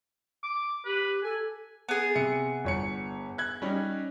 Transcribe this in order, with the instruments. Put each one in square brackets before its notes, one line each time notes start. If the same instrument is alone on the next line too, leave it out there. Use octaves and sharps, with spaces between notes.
[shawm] D6
[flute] G4 [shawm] B4
[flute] A4 [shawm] G#5
[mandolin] B3 G#4
[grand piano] C3 C#7
G1 C#5 C#7
F#6 G#6
G3 C#4 D#4